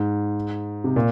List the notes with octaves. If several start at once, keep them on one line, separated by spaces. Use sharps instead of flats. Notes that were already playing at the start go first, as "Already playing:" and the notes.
Already playing: G#2
C3
A#2